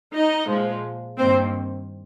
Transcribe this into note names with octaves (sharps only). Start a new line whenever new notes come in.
D#4 D#5
A#2 F3 G#3
G2 D#3 A#3 C4 C5